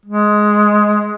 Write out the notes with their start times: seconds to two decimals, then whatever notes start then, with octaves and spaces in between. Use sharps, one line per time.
0.05 G#3